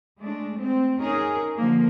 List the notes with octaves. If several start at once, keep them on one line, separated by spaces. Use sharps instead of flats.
G#3 A3 D4
C4
C#4 D#4 G#4 A#4
D3 F3 A#3